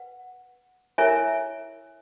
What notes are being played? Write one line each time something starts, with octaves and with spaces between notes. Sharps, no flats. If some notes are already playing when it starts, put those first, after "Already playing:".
Already playing: B4 F#5
E4 A#4 C#5 E5 G#5